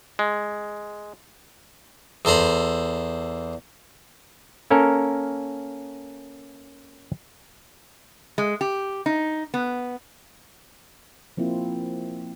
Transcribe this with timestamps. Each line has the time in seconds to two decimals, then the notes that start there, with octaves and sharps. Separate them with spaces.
0.19 G#3
2.25 E2 A4 C5 A#5 B5
4.71 A#3 C#4 A4 A#4
8.38 G#3
8.61 G4
9.06 D#4
9.54 B3
11.37 F3 A#3 C4 E4 F4